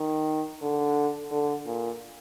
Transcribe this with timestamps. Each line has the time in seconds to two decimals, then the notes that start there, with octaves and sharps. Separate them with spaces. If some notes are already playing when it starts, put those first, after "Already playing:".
Already playing: D#3
0.62 D3
1.31 D3
1.66 A#2